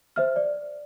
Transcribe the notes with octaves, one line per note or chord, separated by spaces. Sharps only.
C5 E5 F6
D5